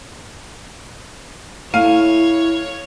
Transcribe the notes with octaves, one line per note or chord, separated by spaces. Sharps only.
A3 E4 C#5 F5 D#7